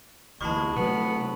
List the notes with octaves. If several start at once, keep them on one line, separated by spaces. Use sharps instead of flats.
D2 E3 G#3 A5 B5 C#6
C3 F#3 A3 B3